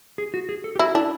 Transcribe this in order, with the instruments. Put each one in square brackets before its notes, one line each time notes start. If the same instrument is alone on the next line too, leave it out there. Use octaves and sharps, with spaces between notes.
[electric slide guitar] G#4
F#4
G#4
A4
G4
[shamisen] E4 [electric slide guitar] F#4
[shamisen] D4 [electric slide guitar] E4